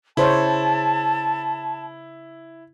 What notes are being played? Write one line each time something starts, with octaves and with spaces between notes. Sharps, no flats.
C#3 E4 C5 C#5 A5